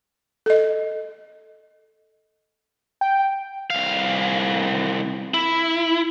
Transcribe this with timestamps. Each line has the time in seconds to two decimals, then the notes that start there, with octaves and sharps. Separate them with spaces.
0.46 A4 D#5
3.01 G5
3.70 C2 F5
5.34 E4